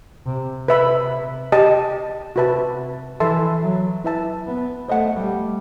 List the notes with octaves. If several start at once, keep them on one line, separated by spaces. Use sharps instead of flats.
C3
C3 B4 E5 B5
G4 D#5 A5
C3 F#4 B4 E5 A5
E3 A4 E5 A5 C6
F#3
E4 B4 E5 A5
B3
A3 C5 D#5 F#5
G3